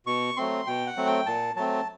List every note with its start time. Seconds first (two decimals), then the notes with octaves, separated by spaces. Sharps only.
0.06 B2 C#6
0.37 F#3 A3 C4 C6
0.66 B2 G5
0.87 F#5
0.97 F#3 A3 C4
1.06 G5
1.26 A#2 A5
1.56 F#3 A3 C4 A5